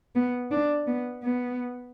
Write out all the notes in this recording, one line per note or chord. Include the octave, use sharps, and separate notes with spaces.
B3
D4
B3
B3